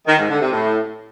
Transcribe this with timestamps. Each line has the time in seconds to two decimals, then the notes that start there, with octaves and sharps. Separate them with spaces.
0.07 D#3
0.18 G#2
0.29 D3
0.41 C3
0.52 A2